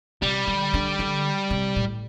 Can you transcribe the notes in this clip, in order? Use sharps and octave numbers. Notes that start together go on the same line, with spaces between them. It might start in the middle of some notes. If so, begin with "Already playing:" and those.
C3 G3
D3
D3
D3
C3
A2